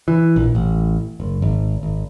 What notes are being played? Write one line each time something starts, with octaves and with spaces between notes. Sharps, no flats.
E3
A#1
A1
F#1
G#1
G#1